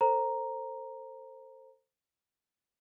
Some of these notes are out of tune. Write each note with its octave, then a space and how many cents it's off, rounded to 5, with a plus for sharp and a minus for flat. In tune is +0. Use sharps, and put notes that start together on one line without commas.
A4 +30 C5 +10 A#5 +0